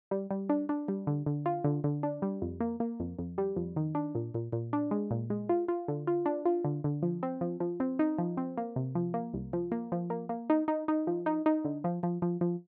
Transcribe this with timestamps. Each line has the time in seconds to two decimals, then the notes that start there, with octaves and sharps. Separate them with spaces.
0.11 G3
0.31 G3
0.49 D4
0.69 D4
0.88 G3
1.07 D3
1.26 D3
1.46 F4
1.64 D3
1.84 D3
2.03 D4
2.22 G3
2.42 F2
2.60 A#3
2.80 A#3
3.00 F2
3.19 F2
3.38 G3
3.56 F2
3.76 D#3
3.95 D4
4.15 A#2
4.35 A#2
4.53 A#2
4.73 D4
4.91 G#3
5.11 A#2
5.30 G#3
5.49 F4
5.68 F4
5.88 D3
6.07 F4
6.26 D4
6.46 F4
6.64 D3
6.84 D3
7.03 F3
7.23 C4
7.41 F3
7.60 F3
7.80 C4
7.99 D#4
8.18 F3
8.37 C4
8.58 A#3
8.76 C3
8.95 F3
9.14 A#3
9.34 C2
9.53 F3
9.72 A#3
9.92 F3
10.10 A#3
10.29 A#3
10.50 D#4
10.68 D#4
10.88 D#4
11.07 F3
11.26 D#4
11.46 D#4
11.65 D3
11.84 F3
12.03 F3
12.22 F3
12.41 F3